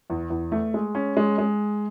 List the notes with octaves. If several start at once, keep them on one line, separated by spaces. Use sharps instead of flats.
E2
E2
A3
G#3
C#4
G#3
G#3